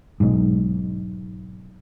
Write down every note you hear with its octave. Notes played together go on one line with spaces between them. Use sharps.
B1 G#2